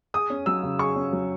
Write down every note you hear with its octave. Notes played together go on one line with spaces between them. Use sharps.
G#4 D#6
C#4
F#3 E6
C#3
G#4 C#6
C#4
F#3